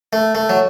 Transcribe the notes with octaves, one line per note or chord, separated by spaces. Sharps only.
A3
A3
F#3